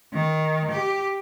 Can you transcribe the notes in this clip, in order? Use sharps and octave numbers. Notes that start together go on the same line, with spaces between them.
D#3
G4